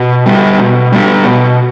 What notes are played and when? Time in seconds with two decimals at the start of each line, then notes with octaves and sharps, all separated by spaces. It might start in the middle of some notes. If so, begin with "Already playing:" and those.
Already playing: B2
0.26 G3 B3
0.59 B2
0.92 G3 B3
1.24 B2